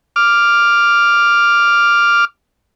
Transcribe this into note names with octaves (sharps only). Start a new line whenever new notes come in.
D6 F6